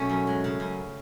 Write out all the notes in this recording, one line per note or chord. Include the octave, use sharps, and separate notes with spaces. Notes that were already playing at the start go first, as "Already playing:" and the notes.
Already playing: B2 F#3 A3 C#4
F#2
G#3
C#3
F#2